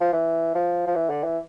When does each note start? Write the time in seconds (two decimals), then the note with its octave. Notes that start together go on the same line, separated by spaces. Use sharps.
0.01 F3
0.13 E3
0.55 F3
0.87 F3
0.95 E3
1.10 D3
1.24 E3